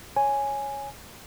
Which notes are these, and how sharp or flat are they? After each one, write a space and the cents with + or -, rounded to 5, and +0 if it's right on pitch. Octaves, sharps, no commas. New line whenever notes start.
C#5 +0 G#5 +0